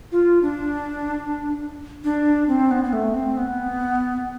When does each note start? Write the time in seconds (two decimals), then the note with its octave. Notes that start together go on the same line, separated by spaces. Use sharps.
0.12 F4
0.42 D4
2.04 D4
2.48 C4
2.71 B3
2.84 B3
2.93 A3
3.14 C4
3.37 B3